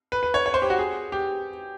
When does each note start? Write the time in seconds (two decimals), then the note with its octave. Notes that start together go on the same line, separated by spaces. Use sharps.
0.12 B4
0.23 B4
0.34 C#5
0.46 C#5
0.54 C5
0.62 G4
0.70 F#4
0.79 G#4
1.12 G4